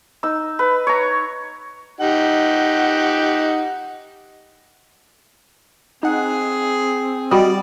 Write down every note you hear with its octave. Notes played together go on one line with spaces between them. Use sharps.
D#4 E6
B4
C#5 A#5
D#4 G4 F#5
C4 D#4 G#4 F#5
G3 F#4 G4 D5 D#5